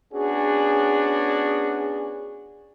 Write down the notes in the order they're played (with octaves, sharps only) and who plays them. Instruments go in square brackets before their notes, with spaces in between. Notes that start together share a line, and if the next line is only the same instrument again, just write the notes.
[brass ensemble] B3 C#4 D4 F#4 G#4